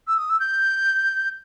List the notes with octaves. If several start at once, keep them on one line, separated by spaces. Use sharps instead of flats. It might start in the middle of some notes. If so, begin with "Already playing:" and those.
E6
D#6
E6
G6